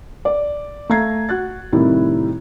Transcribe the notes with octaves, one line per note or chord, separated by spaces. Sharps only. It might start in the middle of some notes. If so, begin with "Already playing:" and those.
D5
A3 F5 A#5 G#6 C7
F#4 F#6 A6
A2 C3 D#3 G3 E4